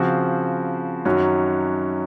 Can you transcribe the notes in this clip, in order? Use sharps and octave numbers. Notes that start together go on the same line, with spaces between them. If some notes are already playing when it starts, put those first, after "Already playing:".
Already playing: C#3 F3 C4 F#4
F#2 D#3 F#3 C#4 F#4